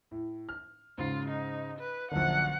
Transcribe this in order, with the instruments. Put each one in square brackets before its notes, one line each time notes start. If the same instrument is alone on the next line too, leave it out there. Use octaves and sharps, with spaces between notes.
[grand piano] A2
F6
[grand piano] G#2 C#3 C7 [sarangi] F4
[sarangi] D#4
B4
[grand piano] A#1 F#2 D3 [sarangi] F#5